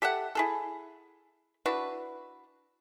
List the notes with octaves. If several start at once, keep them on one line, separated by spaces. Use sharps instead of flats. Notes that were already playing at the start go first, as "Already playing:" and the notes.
G4 A4 E5 F#5
E4 G#4 A4
D4 E4 F#4 B4